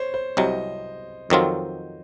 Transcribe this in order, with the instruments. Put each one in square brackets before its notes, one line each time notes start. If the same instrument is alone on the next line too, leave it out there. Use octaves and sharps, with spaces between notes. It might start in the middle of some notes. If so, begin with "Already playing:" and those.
Already playing: [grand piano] C5 C#5
C5
[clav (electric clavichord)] C2 C3 F#3 [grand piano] D#5
[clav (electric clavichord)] F2 D#3 F#3 C4 F4